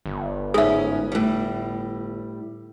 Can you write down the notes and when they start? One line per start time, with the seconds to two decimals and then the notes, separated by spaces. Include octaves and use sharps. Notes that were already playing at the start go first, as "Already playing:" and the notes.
0.06 G1
0.54 G#2 C#4 G#4 E5
1.12 A2 G3